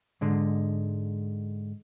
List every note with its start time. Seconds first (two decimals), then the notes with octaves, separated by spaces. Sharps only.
0.21 G#2 D3 G#3